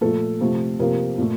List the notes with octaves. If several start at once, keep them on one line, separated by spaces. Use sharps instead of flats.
A#2 F3 A3 A4
C3 F3 A3
C3 F3 A#3 A#4
A#2 A3